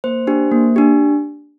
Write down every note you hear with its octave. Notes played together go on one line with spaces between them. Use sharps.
A#3 C5
D4 G4
A#3
D4 G4